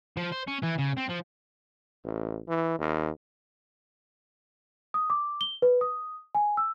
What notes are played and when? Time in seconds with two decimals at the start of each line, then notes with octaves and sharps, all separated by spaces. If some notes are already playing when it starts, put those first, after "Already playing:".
0.17 F3
0.32 C5
0.48 C#4
0.63 E3
0.79 C#3
0.98 C4
1.10 F3
2.04 A1
2.48 E3
2.79 D#2
4.94 D#6
5.10 D6
5.41 G7
5.62 B4
5.81 D#6
6.35 G#5
6.57 E6